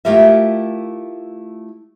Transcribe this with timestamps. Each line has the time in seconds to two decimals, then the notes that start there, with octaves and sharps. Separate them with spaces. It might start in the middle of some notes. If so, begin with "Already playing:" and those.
0.05 A3 E4 F4 G4 A#4 E5